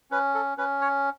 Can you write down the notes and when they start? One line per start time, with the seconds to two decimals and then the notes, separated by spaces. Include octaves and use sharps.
0.11 C#4 B4
0.34 A4
0.58 C#4 B4
0.81 C#5